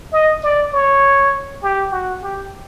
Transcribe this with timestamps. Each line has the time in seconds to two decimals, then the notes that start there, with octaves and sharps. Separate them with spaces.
0.12 D#5
0.43 D5
0.73 C#5
1.63 G4
1.91 F#4
2.22 G4